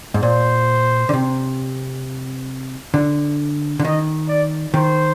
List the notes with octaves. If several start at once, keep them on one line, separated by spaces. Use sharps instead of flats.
G#2
A#2 C5
D3
C3
D3
D3
D#3 D#5
D5
D#3 C5